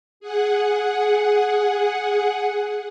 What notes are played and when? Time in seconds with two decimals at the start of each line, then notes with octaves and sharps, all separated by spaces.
0.20 G#4 F#5